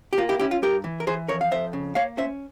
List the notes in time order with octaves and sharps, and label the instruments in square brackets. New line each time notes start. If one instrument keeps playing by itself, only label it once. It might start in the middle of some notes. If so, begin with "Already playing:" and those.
[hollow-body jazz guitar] G4
A#3 F4
E4 G4
C#4 E4 G4
F4
G2 G4 A#4
E3
A#4
E3 G#4 C5
F2 A#4 C#5
F5
F2 C5 E5
C#3
A#3 C#5 F5
C#4 C5 E5